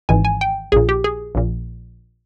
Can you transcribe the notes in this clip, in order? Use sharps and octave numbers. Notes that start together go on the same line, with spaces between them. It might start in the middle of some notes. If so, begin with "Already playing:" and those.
G#1 G#2 E3 G#5
G#5
G5
A#1 A#2 G#4
G4
G#4
A#1 A#2